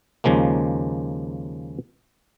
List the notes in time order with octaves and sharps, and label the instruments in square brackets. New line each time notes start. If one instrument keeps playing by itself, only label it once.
[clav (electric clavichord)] D#2 C#3 F3 G#3 A#3